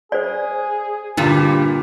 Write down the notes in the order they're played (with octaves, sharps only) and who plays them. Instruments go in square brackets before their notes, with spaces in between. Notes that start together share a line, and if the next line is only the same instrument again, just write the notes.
[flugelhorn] G#4 [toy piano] C5 D5
[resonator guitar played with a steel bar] G2 A#2 [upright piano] D3 [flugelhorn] G4